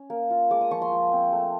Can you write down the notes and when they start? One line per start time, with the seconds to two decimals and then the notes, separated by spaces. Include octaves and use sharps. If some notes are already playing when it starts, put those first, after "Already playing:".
Already playing: C#4
0.10 A#3
0.30 F4
0.51 G#3 D6
0.61 D#6
0.71 F3 C#6
0.82 C6
0.92 F3
1.12 C4
1.32 A3